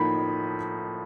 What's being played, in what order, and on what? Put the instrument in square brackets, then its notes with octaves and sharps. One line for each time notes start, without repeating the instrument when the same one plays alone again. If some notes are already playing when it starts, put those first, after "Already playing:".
Already playing: [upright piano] A2 F3 A#3 D#4 [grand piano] B5